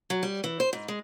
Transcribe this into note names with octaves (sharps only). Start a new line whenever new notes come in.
F#3
G3
E3
C5
G#2
G#3